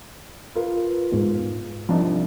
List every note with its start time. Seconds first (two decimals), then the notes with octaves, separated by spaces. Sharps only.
0.55 F4 A#4 B4
1.12 G#2 B2
1.89 C2 F3 D4 D#4